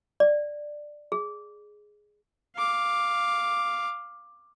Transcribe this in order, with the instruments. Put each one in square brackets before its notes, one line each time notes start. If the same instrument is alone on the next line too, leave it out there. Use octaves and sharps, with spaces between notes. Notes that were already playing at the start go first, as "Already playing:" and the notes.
[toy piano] D5
G#4
[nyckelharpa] F5 D6